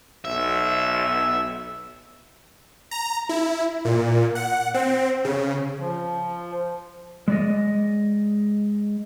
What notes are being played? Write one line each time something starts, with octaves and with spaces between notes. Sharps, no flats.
B1 E5
A#5
E4
A#2
F#5
C4
C#3
F3
G#3 D5 D#5